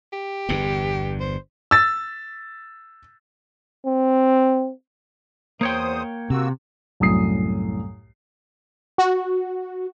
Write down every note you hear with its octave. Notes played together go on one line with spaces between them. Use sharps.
G4
G1 E2 G2
C5
E6 A6
C4
E2 A#3 C5 C#5 G5 D#6
C3 A#3 F#4 E6
C2 F#2 A2 D#6 C7
F#4